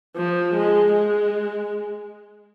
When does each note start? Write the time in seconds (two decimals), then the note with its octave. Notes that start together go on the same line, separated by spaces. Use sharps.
0.16 F3
0.54 G#3
0.92 G#3